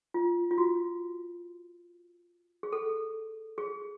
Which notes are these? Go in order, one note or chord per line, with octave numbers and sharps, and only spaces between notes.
F4
F4
F#4
G#4
A4
G#4